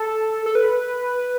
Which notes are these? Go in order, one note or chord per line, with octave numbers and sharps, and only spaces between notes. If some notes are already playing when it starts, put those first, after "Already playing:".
Already playing: A4
A4
B4